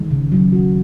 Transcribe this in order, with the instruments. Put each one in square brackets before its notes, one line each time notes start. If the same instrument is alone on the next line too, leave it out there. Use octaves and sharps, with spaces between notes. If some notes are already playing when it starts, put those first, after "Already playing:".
Already playing: [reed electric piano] D#3 [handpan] G#3
[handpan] C#3
F#3
F#4